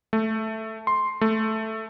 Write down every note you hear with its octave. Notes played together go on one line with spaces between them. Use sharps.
A3
C6
A3